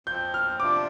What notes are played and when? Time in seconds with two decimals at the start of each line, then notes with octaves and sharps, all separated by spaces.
0.07 F2 F3 C4 G6
0.34 F6
0.60 C3 F3 D4 F4 D6